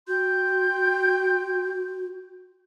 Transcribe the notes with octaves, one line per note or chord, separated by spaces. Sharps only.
F#4 G5 C6 G6